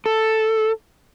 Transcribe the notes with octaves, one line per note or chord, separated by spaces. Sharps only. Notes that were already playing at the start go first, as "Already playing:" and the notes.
A4